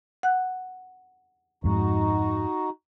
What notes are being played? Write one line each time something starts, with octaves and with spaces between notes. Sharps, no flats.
F#5 F#6
F2 G#2 D#4 F#4